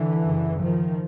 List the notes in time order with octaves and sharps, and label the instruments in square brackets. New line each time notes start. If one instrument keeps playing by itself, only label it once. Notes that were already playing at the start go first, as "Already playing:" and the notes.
Already playing: [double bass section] D3 E3
F#2 C#3
D#3 F3